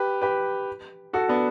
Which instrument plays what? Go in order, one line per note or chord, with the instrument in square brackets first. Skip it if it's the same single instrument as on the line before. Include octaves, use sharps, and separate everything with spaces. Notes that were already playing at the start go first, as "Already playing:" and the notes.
Already playing: [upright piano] G4 B4
G4 B4
F#4 A4
B3 D4